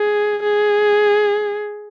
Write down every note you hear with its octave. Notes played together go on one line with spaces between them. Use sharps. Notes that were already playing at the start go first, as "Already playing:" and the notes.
Already playing: G#4
G#4